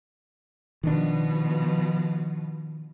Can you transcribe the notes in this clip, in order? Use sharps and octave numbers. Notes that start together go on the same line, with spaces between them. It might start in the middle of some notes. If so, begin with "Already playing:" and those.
B2 D#3 F3 D4